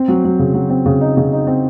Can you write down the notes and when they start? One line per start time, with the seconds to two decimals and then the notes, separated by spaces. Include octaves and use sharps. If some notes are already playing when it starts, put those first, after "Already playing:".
Already playing: C4
0.08 F#3
0.25 F#3
0.39 C#3
0.54 F#3
0.70 C4
0.86 C#3
1.01 D#4
1.17 C#3
1.32 D#4
1.47 C4